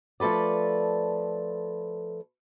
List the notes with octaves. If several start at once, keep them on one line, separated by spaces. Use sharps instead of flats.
F3 A3 A4 B4 D5